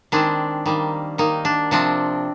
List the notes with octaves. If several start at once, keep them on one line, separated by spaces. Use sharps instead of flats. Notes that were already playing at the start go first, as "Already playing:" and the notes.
D#3 G#3 C4 D4
D#3 G3 A#3
D#3 A#3 D#4
D4
C3 F3 C4 D4